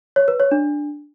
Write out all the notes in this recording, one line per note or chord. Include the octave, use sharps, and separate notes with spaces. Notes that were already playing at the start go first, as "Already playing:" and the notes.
C#5
B4
C#5
D4